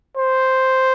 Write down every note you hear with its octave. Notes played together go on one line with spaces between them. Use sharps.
C5